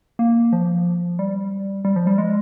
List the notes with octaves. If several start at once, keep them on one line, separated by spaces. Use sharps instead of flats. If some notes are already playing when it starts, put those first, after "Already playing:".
A#3
F3
G3
G3
F3
G3
G#3